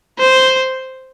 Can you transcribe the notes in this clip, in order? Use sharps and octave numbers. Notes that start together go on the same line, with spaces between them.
C5